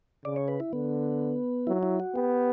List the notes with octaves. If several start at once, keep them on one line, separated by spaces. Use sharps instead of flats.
C#3 D5
C#5
B4
E4
D3 B3
F#3 E4
E4
F#4
B3 G4